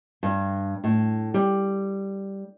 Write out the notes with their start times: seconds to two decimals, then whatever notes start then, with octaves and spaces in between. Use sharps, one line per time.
0.23 G2
0.84 A2
1.34 G3